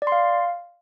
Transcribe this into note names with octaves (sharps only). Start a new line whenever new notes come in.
D5
C6
F5